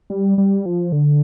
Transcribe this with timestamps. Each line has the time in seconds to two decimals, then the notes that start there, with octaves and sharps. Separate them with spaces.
0.10 G3
0.38 G3
0.66 F3
0.92 D3